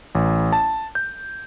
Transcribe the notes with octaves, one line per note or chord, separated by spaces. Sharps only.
A1
A5
G6